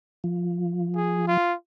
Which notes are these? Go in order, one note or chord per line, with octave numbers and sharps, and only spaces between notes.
F3
G#4
F4